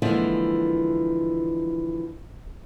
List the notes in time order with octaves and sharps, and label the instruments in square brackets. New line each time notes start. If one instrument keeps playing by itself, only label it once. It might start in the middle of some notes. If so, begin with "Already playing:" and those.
[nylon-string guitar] D3 E3 F3 G#3 A#3 E4